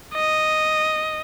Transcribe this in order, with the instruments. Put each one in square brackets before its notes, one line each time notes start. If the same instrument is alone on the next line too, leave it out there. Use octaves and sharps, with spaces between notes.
[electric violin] D#5